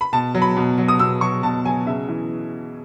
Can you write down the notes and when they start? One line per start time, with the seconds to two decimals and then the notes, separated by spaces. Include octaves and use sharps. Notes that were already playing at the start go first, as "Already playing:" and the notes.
0.01 B5
0.13 B2 A5
0.35 F#3
0.42 B5
0.57 B2
0.78 F#3
0.88 D#6
0.99 B2 E6
1.21 F#3 C#6
1.43 B2 A5
1.65 F#3 G#5
1.86 C#3 E5
2.09 E3